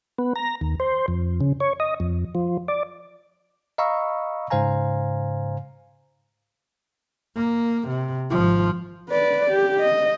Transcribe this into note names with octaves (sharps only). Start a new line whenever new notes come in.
B3
A#5
D#2
C5
F2
C#3
C#5
D#5
F2
F3
D5
D#5 F5 A#5 B5 C#6 E6
G#2 C#3 C5 F5 G#5 A#5
A#3
C3
G#1 F3
B4 D5
G4
D#5